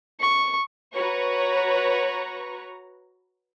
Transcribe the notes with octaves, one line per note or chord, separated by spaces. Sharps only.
C#6
F#4 B4 C#5 A#5 C#6